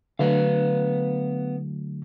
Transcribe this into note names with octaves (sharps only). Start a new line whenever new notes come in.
D3 F#3 A3 B3 B4 F5